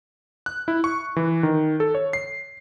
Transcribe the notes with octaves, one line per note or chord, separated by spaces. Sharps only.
F#6
E4
C#6
E3
D#3
A4
C#5
C7